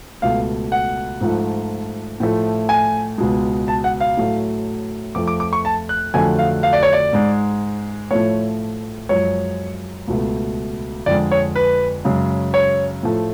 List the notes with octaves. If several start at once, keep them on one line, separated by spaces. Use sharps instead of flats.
C#2 B2 A3 F5
F#5
G#2 F3 A3
A2 F3 A3
G#5
C#2 B2 G#3
A5
F#5
F5
A2 F#3 A3
F2 F3 A3 D6
D6
D6
C#6
A5
F#6
F2 D3 F#3 A3 G#5
F5
F5
D5
C#5
D5
G#2 G#3
A2 F3 A3 C#5
F#2 F3 G#3 C#5
C#2 B2 A3
F2 D3 G#3 D5
C#5
B4
F#2 C#3 G#3
C#5
A2 F3 A3